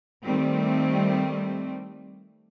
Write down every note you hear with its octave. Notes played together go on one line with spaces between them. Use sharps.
D#3 G3 A3 C4